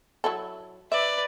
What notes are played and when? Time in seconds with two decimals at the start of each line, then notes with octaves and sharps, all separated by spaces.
0.24 F#3 E4 A4
0.92 B4 D5 E5